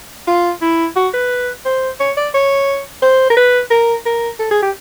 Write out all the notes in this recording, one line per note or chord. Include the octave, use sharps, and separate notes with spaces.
F4
E4
F#4
B4
C5
C#5
D5
C#5
C5
A#4
B4
A#4
A#4
A4
G#4
G4